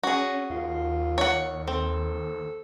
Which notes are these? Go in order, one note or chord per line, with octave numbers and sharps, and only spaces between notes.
C#4 F#4 G#4
D#2 F4
C#5 F#5
C4 A4